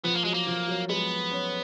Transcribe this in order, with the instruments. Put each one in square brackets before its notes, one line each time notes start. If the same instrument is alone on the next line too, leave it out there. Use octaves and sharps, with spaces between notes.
[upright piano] F3 [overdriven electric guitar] B3
[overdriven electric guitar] A#3
[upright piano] F#3 [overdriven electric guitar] G#3
[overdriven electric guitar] A#3
[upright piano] F3
F#3
[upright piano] G#3 [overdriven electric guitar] B3
[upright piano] C#4